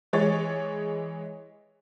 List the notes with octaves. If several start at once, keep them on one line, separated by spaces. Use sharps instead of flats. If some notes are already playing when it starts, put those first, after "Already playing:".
E3 G#3 C#5 D#5 A6